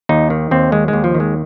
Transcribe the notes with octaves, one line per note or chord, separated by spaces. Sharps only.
D#2 D#4
D#3
D#2 C4
D#3 G#3
G#3
D#2
F3
D#3
G#3